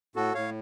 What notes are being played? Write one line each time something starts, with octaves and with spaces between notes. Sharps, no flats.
A2 F#4 A4
A2 C#5 F5